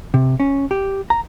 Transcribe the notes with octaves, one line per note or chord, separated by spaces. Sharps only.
C3
C#4
G4
A#5